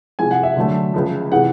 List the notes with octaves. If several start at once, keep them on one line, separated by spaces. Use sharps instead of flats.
C2 C3 F3 G#3 G#5
F#5
E5
D3 F#3 A3
C#2 C#3 F3
C3 E3 G#3 F#5